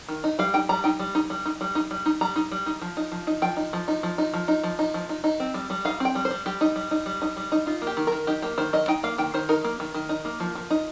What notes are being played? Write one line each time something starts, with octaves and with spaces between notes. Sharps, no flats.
D#3
D#4
G3 F5
D#4 G5
G3 A#5
D#4 G5
G3
D#4
G3
D#4
G3
D#4
G3
D#4
G3 A#5
D#4
G3
D#4
F3
D#4
F3
D#4
F3 G5
D#4
F3
D#4
F3
D#4
F3
D#4
F3
D#4
F3
D#4
D#4
C4
G3
G3
D#4 F5
C4 G5
G3
C5
G3
G3 G4
D#4
G3
D#4
G3
D#4
G3
D#4
D#4 F4
A#3
G4
D#3
D#3 A#4
D#4 G4
A#3 G4
D#3 C5
D#3 D#5
D#4 G5
A#3 F5
D#3 G5
D#3 C5
D#4 A#4
A#3
D#3
D#3
D#4
A#3
F3
F3
D#4